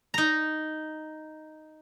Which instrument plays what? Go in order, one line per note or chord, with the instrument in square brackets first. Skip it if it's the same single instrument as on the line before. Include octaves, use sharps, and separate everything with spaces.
[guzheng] D#4 A#5